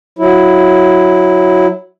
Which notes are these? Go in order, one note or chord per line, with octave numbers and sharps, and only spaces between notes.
F#3 E4